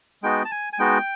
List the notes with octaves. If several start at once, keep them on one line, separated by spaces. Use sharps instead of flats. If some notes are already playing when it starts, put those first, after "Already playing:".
G#3 B3 D#4 F#4 G5
A5
G#5
G#5
G#3 B3 D#4 F#4 G5